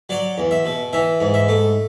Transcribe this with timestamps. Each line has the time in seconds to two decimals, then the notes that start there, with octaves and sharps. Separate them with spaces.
0.09 F#3 D5
0.38 E2
0.51 E5
0.65 B2
0.93 E3 E5
1.21 G#2
1.34 E5
1.49 A3